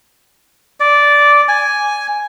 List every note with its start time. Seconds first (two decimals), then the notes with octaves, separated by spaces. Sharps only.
0.80 D5
1.48 G#5